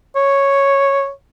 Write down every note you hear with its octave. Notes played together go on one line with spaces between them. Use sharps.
C#5